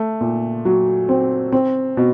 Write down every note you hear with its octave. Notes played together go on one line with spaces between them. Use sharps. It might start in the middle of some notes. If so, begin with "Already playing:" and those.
Already playing: A3
A#2
F#3
C4
C4
B2